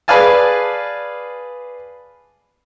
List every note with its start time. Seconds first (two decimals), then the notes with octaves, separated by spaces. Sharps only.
0.08 G#4 B4 D5 F5 G#5 A5